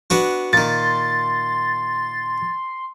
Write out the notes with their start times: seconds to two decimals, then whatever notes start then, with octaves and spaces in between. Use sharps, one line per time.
0.10 B3 D4 F#4
0.53 A#2 D#3 A6
0.69 C6